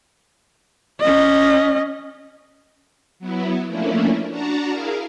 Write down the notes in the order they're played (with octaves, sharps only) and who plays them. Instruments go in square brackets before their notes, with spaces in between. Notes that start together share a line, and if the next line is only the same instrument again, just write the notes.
[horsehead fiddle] C#4 D#5
[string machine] F#3 B3 E4
F3 A3 A#3 C#4 D4 E4
D4 F#4 A5 A#5
E4 G#4 A#4 F5